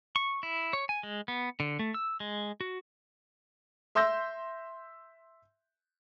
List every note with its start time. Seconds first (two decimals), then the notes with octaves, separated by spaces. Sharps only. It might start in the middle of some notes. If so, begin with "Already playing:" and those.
0.16 C#6
0.43 E4
0.73 C#5
0.89 G#5
1.03 G#3
1.28 B3
1.60 D3
1.79 A3
1.94 E6
2.20 G#3
2.61 F#4
3.95 E5 C6 E6 G6 A#6